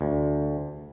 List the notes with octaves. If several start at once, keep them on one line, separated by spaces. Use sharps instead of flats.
D2